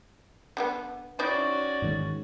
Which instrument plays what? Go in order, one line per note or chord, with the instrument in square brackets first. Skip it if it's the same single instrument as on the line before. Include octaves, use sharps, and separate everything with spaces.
[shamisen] D3 A3 B3
[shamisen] C4 D#4 E4 [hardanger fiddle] C#4 F#4 [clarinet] D5
[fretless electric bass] G#2 D#3 G#3